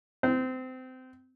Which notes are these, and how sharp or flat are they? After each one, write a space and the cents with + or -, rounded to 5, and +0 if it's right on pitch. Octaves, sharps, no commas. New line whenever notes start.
C4 -25